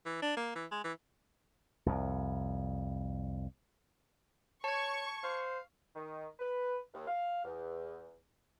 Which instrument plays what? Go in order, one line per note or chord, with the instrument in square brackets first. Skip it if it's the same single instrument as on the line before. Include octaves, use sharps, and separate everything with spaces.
[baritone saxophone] E3
D4
A#3
E3
G#3
E3
[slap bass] C2 F2
[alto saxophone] C#5 [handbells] A5 G#6 [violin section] C#6
[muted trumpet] C5 [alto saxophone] F5
[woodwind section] D#3
B4
D#2
F5
E2